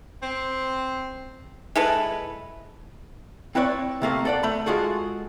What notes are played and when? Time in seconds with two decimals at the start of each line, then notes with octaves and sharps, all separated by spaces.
0.23 C4
1.75 G#3 E4 A4 B4
3.55 C4 E4 B4 C#5 D5
4.02 C3 A3 A#3
4.25 A4 D5 F#5
4.43 A3 B5
4.66 G#3 F4 F#4 G#4 A4